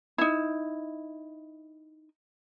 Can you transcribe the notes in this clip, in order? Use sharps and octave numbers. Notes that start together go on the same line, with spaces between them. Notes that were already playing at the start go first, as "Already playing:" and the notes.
D#4 E4